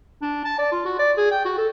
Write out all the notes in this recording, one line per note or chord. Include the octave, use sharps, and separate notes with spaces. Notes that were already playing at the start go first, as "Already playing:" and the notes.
D4
A5
D5
F4
F#4
D5
G#4
G5
F#4
A4